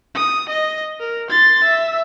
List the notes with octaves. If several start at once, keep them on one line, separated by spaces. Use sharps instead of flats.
D#6
D#5
A#4
C6 A6
E5